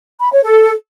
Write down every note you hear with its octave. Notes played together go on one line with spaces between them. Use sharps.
B5
C#5
A4